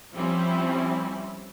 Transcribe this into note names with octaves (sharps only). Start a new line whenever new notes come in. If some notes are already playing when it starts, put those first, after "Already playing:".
F3 G3 C4 C#4 E4